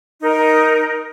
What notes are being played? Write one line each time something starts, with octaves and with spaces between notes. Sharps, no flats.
D#4 A#4